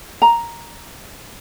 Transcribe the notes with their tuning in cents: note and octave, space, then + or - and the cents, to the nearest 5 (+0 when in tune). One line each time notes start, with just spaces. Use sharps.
A#5 +0